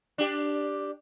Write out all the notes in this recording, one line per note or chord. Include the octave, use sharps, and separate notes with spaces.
D4 G4